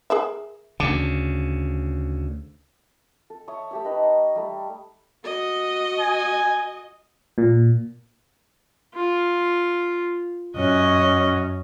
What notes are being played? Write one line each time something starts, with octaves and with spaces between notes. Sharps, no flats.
G#4 A#4 E5
D2 C#3 D4
A4
C#5 E5 C#6 D#6
A3 G4 E6
D#4 B4 D#5
A#5 C#6
G3 A3
F#4 D#5
G#5
A#2
F4
F#2 C#4 F#4 D#5